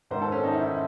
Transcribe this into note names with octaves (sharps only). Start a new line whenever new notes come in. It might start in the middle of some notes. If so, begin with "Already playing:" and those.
G#2 D#3 C5
A4
C#4
D#4
E4